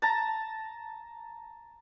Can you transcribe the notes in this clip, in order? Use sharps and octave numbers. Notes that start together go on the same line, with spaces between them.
A5 A#5